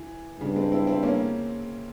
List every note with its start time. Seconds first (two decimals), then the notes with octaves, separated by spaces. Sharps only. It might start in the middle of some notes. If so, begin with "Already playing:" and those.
Already playing: E3
0.40 G2 C#3
0.56 G#3 C4
0.72 C4 E4
0.87 C4 E4
1.03 A#3 C#4